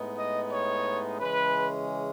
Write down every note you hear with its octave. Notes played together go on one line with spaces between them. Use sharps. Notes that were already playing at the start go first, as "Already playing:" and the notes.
Already playing: A2 G#3 B3 D#4
D#5
C#5
C#3 E3 G#3 C#4 B4